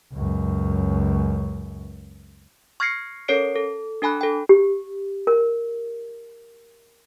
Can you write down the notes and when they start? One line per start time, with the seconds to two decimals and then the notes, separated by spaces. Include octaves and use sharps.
0.13 C#2 F#2
2.80 C#6 F6 G#6 A#6 C7 C#7
3.28 C#4 A4 A#4 C#5 C7 D7
3.56 A4
4.02 D4 A4 G#5 B5 F#6
4.21 A4 G5
4.49 G4
5.27 A#4